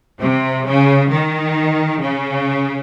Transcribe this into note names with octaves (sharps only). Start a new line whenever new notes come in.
C3
C#3
D#3
C#3